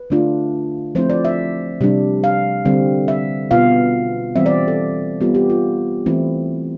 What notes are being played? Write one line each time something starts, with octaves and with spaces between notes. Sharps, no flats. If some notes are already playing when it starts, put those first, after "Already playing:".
Already playing: B4
D3 A3 D4 F4
F3 A3 C4 E4 C5
D5
E5
C3 G3 D4
F5
D3 G3 C4
E5
B2 B3 F4 F5
E3 G3 C4 E5
D5
A4
G3 B3 F4 G4
G4
F4
E3 A3 C4 E4